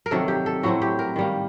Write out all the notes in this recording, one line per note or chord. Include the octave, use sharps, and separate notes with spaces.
A#4
C3 D#3 F#3 A4
G4
A4
A2 F#3 C4 F#4
G4
A#4
D#3 G3 A#3